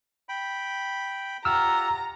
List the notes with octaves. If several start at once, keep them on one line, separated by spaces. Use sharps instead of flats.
G5 B5
F4 G4 F#5 A#5 E6 F6